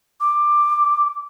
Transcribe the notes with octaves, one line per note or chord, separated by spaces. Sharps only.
D6